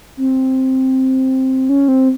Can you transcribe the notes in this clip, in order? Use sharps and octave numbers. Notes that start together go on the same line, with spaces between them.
C4
C#4
C4